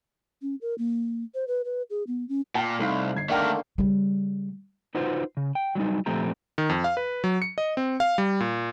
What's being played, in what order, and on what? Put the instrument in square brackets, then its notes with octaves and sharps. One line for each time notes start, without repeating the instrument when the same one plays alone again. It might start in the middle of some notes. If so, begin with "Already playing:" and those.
[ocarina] C#4
A#4
A#3
C5
B4
B4
G#4
B3
C#4
[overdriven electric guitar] A#2 [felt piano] G5 A5
[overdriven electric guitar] C2 [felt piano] A3 D#4 F5
[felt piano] G1 G#6 C7
[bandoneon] D3 D#3 A#3 [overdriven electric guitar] A3 A#4 [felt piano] D5 G5 D6
[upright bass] C#3 G3
[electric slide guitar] D#4 F4 F#4 B4 C5
C#3
G5
F#3 G3 D#4
A#2 F3 A3 C4 G4 A#5
[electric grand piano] D#3
F2
F5
B4
F#3
C#7
D#5
C4
F5
G3
A#2